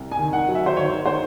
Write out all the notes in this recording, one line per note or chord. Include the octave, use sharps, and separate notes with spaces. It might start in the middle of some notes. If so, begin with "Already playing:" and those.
Already playing: C2
G#5
D#3
F#5
F#3
E5
C5
D#3 C#5
D#3 C5